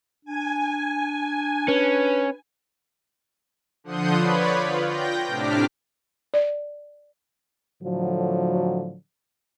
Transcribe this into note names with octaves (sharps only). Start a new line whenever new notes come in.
D4 G#5
C#4 B4
D3 F3 F#5 C6 D#6 G6
B4 C#5 D5 B5
F4
G5 G6 A#6
A2 C3 D4 D6 F6 B6
D5
A2 D3 F3 F#3